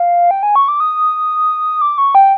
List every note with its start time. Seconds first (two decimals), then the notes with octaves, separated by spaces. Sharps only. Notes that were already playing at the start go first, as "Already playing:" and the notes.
Already playing: F5
0.31 G5
0.43 G#5
0.56 C#6
0.68 D6
0.80 D#6
1.81 D6
1.98 C#6
2.15 G5